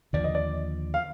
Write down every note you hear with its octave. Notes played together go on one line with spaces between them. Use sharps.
D#2 D3 F3 D5
D#5
D5
F5